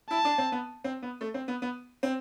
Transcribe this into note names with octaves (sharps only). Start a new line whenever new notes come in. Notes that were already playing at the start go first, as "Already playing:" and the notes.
E4 A5
D4
C4
B3
C4
B3
A3
C4
B3
B3
C4